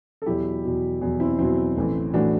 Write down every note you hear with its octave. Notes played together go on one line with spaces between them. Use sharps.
A4
E2 B2 F#3 E4 G4
E2 B2 F#3
E2 B2 F#3
C4 E4
E2 B2 F#3 C4 E4
A1 A2 E3
A2 E3 D4 F#4